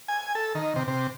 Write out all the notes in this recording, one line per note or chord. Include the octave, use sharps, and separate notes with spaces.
G#5
A4
D#3
C3
C3